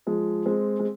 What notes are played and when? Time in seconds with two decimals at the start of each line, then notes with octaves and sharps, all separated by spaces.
0.07 F3 G#3
0.46 G#3 C4
0.80 G#3